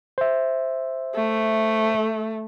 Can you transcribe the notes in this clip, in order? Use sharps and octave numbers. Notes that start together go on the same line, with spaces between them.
C5 E5
A3